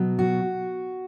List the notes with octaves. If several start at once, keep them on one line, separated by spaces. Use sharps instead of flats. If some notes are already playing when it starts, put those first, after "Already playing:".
Already playing: B2 F#3 B3
F#4